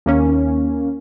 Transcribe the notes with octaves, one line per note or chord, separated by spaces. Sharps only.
D#2 A#3 C#4